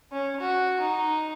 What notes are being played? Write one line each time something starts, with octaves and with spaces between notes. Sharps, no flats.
C#4
F#4
D#4